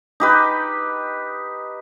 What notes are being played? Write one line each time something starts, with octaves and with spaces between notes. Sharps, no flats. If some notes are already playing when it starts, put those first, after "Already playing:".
D#4 G4 B4